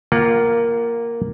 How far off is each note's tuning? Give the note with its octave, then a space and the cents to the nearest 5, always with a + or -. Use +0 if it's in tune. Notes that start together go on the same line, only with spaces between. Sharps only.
A#3 +0 F4 -10 F#5 +30